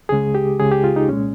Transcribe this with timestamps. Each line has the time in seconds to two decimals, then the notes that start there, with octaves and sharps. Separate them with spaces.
0.09 C#2 C#3 G#3 G#4
0.35 G4
0.59 C#2 C#3 G#3 G#4
0.72 G4
0.84 F4
0.96 D#4
1.08 C2 A#2 G#3 C#4